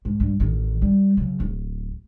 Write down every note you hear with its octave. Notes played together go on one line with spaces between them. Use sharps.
G#2
G2
A1 D#3
G3
C#3 F#3
D1